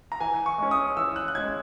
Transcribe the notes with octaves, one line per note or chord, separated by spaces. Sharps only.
A#5
E3 G#5
C#6
G#3 C#4
D#6
E3 E6
F#6
F#6
G#3 C#4 G#6